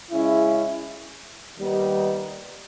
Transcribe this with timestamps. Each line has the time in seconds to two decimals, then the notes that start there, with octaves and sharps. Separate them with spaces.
0.11 C#3 G#3 C#4 E4
1.58 D#2 D#3 G3 B3 D#4